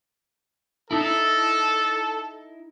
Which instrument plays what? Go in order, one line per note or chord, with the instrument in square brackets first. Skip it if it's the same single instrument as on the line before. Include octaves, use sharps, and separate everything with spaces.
[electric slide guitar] D#4 E4 [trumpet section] A4